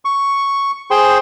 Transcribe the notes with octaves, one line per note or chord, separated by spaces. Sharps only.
C#6
G#4 C5 G5 C6